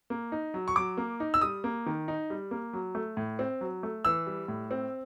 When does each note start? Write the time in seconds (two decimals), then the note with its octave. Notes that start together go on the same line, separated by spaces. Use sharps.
0.10 A#3
0.32 D#4
0.54 F#3
0.68 C#6
0.76 F#3 D6
0.97 A#3
1.20 D#4
1.34 E6
1.41 G3 D#6
1.64 A#3
1.86 D#3
2.08 D#4
2.30 G3
2.51 A#3
2.73 F#3
2.95 A3
3.17 A2
3.39 C4
3.61 F#3
3.83 A3
4.05 E3 E6
4.27 G3
4.48 A2
4.71 C4